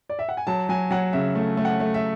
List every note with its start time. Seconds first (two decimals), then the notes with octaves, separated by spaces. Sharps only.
0.10 D5
0.19 E5
0.29 F#5
0.37 G#5
0.47 F#3 A5
0.69 F#3 G#5
0.91 F#3 F#5
1.13 C#3 E5
1.35 A3
1.57 A3
1.65 F#5
1.80 A3
1.94 E5